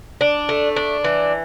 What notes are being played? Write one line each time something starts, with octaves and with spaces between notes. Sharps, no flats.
D4
A3
D4
E3